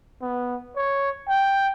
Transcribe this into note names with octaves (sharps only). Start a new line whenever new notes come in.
B3
C#5
G5